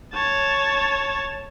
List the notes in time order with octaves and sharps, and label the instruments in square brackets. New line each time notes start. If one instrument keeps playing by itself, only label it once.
[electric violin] C#5 A5